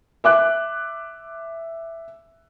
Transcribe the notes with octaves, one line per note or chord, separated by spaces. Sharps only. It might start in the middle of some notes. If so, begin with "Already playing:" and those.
E5 D6 F#6